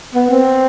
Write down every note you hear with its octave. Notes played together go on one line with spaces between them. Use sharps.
B3
C4